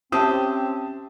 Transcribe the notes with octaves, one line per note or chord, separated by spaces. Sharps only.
C4 C#4 G4 C5 E5 A5 D#6